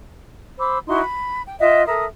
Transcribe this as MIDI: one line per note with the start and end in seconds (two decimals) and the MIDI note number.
0.58 0.78 72
0.58 0.78 83
0.58 0.78 86
0.58 0.78 88
0.87 1.00 63
0.87 1.00 64
0.87 1.00 66
0.87 1.00 84
1.01 1.41 83
1.47 1.56 79
1.60 1.85 65
1.60 1.85 75
1.60 1.85 76
1.60 1.85 78
1.86 2.05 69
1.86 2.05 70
1.86 2.05 76
1.86 2.05 87